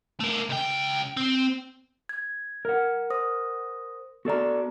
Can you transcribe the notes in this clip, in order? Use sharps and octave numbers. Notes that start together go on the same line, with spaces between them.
A3 A#4
C#2 G5
C4
G#6
A#4 F#5
C5 D#6 A#6
B3 F#4 A4 D5 A#5